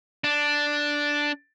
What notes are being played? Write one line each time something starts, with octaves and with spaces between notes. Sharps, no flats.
D4